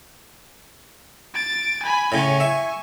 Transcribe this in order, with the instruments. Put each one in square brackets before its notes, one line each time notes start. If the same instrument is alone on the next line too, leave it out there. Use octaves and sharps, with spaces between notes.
[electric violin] A6 D7
G#5 B5
[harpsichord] A2 C#3 [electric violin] G#5 C#6
[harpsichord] E5